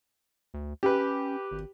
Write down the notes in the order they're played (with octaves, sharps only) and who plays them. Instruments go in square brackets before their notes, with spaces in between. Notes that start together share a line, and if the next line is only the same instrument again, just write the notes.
[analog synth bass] D2
[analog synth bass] C#4 [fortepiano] G4 B4
[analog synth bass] G#1